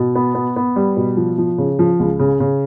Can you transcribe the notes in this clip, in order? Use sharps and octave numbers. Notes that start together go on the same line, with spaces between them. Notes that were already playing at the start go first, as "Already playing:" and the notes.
Already playing: B2
B3
B3
B3
G3
B2
F3
F3
C#3
F3
C#2
C#3
C#3